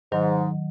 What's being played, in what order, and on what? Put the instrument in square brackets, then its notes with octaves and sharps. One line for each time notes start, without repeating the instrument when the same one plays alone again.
[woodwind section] G#2 [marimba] D#3 F#3